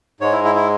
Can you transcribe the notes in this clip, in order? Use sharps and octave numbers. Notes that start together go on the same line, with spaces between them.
G#2 G#3 C#5
E4
E4
E4